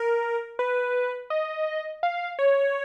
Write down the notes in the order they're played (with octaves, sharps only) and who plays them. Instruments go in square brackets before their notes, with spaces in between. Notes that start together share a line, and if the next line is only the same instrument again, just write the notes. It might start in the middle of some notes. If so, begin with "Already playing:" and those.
Already playing: [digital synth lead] A#4
B4
D#5
F5
C#5